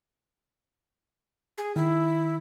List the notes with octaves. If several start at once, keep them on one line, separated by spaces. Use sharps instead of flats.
G#4
D#3 E4